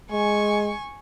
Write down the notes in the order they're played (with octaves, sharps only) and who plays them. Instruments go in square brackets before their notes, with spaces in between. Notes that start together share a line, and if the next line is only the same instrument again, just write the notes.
[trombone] G#3 [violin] G#5 C#6